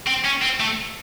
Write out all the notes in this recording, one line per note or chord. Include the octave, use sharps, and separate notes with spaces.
C4
C#4
C4
A3